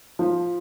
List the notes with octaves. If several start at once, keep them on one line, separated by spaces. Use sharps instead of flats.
F3